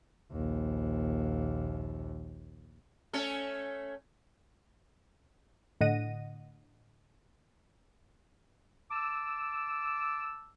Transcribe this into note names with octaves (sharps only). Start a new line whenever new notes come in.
A#1 D#2
A3 C#4 A4
A2 D3 D#5 F#5 A#6 D#7
A5 D6 E6